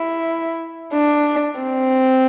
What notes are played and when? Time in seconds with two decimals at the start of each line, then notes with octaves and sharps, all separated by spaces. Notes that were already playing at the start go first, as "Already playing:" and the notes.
Already playing: E4
0.93 D4
1.59 C4